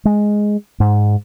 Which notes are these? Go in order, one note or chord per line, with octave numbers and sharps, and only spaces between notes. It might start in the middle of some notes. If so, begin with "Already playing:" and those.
G#3
G#2